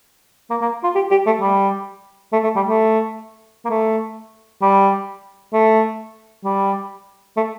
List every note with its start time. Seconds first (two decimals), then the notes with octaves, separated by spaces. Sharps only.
0.50 A#3
0.62 A#3
0.83 F4
0.95 G4
1.11 G4
1.26 A3
1.41 G3
2.33 A3
2.44 A3
2.56 G3
2.68 A3
3.65 A#3
3.70 A3
4.62 G3
5.53 A3
6.44 G3
7.37 A3